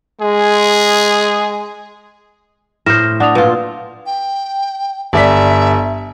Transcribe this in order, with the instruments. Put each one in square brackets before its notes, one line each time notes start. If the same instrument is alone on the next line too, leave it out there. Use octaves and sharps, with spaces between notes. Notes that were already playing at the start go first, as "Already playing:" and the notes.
[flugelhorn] G#3 [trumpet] G#4
[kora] A2 C5 [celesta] F6 A#6 E7
[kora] D4 [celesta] F#5 D#6 F7
[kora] A#2 F4 [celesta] B4
[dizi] G5
[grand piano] G1 D5 B6 [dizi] E5